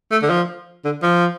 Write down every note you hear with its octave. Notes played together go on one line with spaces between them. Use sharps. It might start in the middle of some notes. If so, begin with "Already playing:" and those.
A3
D3
F3
D3
F3